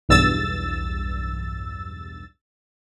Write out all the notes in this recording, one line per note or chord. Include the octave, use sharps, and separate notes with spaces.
B1 E2 G2 E6 A6